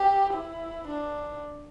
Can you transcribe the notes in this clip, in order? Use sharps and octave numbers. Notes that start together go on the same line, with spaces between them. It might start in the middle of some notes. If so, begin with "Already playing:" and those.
Already playing: G4
E4
D4